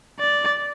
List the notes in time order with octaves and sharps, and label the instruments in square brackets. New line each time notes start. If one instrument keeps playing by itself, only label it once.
[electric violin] D5